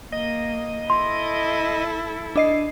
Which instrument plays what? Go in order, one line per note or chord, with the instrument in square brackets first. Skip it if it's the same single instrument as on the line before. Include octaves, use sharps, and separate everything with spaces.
[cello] A#3 [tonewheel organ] D#5
[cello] E4 A4 [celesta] C6
[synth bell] D4 D#5 C7